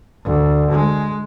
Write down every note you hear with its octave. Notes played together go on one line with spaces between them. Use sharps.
D2
G#3